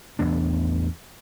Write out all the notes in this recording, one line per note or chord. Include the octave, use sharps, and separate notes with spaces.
A1 E2 B3 D4